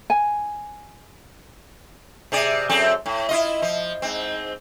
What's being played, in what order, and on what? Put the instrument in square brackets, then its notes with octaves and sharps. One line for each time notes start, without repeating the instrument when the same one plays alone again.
[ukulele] G#5
[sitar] C3 G#4 D5
F#2 C4 A4
A2
E4 F4 D#5
F3
G#2 C4